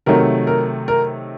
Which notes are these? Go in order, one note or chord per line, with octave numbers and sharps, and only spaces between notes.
C3 D#3 F#3 A3 A#4
A#4
A#4